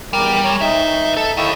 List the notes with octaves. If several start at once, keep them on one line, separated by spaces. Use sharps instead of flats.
E2 G3 A#4 D6
C#5 A#5
D#4 B4 E5
A4
E4 D#5 F5 G5 C#6